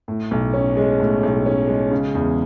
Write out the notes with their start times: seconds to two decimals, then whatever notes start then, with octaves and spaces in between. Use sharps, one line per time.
0.08 A2
0.31 B1
0.54 C#4
0.77 G#3
1.00 A2
1.23 B1
1.46 C#4
1.68 G#3
1.91 C#3
2.15 E2